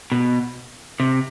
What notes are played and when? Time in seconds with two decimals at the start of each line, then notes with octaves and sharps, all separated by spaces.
0.12 B2
1.00 C3